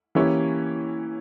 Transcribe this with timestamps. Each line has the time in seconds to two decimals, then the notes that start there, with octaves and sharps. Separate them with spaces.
0.15 E3 A#3 C#4 E4 G4